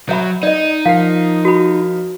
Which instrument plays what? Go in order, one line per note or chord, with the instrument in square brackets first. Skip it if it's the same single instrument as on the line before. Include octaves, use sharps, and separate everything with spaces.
[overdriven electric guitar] F#3 [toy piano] C#5 E5 B5
[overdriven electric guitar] D#4 [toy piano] D5 D#5
[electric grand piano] F3 A#4 C7 [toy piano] F5
[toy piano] F#4 B5